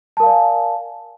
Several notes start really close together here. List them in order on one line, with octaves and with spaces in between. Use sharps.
A5 A#4 F5 D5 G#5